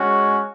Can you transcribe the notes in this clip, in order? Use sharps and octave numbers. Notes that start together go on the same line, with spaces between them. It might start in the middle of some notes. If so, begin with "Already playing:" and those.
Already playing: G#3 C#4 F#4